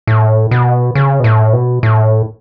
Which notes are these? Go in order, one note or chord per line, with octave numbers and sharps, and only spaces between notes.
A2
B2
C#3
B2
A2
B2
A2